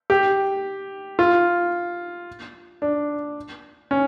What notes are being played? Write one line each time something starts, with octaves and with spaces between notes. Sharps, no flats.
G4
F4
D4
C#4